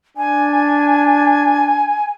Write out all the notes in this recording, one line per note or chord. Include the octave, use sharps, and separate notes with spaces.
D4 G#5